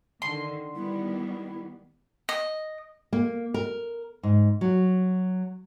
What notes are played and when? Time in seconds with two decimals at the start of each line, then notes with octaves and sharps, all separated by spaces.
0.22 D3 D#3 C6
0.75 D#3 G3 B3 E4
2.29 D#5
3.13 A#3
3.54 A#4
4.23 G#2
4.61 F#3